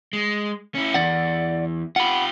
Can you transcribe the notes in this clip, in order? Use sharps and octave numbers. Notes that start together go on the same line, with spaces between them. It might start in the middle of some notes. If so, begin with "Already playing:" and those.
G#3
C#4 E4
E2 D5 F#5
F4 G4 F#5 B5